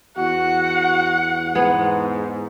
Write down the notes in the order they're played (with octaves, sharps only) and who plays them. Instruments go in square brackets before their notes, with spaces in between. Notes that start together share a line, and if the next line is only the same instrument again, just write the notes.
[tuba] E2 [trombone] F#4 [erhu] F#5
[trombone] G#2 [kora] B3 G#4